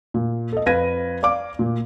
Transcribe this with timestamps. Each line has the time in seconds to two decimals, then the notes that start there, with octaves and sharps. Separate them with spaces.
0.14 A#2
0.53 A4 D#5
0.66 F2 B4 F5 G#6 A#6 D#7
1.23 D5 F5 D6
1.59 A#2